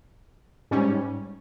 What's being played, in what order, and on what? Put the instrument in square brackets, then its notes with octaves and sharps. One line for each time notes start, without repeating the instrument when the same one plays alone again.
[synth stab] G#2 G3 C#4